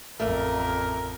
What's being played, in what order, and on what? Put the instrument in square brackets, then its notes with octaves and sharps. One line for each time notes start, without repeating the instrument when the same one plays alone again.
[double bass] A1 F2 [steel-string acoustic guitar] A3 A#3 [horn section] A#4